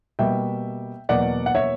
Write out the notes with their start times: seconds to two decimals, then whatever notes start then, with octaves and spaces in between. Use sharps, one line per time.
0.19 B2 G3 A#3 E5 G5
1.09 E2 B2 F#3 A#3 D5 F#5
1.46 F#5
1.55 C#5 E5